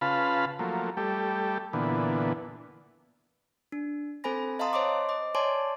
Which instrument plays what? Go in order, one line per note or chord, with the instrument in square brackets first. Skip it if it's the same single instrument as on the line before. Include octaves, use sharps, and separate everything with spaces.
[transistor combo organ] C#3 F4 B4 F5 A5 B5
F3 F#3 A3 A#3
G3 A3 G4 A4
A#2 D3 E3 B3
[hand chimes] D4
C4 A4 C5 G#5 B5 A#6
D#5 F5 A5 A#5 C6 D#6
C5 C#5 D#5 C6 D6
D#5 D6
C#5 D5 G#5 A5 C6 D6